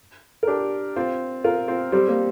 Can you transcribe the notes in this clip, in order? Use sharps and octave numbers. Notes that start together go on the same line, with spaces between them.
A#4
D4 G4
C4 F4
F4 A#4
C4 F4
G3 C4
A#3